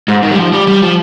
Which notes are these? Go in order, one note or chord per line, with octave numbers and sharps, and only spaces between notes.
G#2
D#3
G3
F3
G3
G3
F3